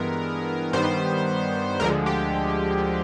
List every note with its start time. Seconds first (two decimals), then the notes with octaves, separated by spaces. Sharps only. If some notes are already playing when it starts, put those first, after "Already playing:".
Already playing: G2 E3 G#3 B3 A#4
0.73 G2 D#3 G3 B3 C5
1.79 D2 D3 F3 G#3 A#4
2.06 G4